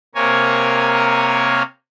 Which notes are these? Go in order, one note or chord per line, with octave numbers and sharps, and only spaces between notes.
C3 A#3 A#4 C#5 G#5